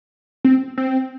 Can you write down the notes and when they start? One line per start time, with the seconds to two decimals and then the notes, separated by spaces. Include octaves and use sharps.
0.45 C4
0.78 C4